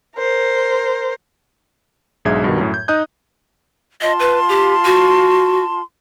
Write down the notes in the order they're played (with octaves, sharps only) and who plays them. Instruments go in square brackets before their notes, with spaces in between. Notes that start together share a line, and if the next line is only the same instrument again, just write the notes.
[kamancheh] A#4 C5
[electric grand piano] B1 G#2 D4 G#4 E5 G#6
G2 B2 D#3
F#2 A2
G6
D#4 D#5 D#6 F#6 G6
[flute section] F4 A5 C6 [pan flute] D#5
[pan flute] B4
G4
F#4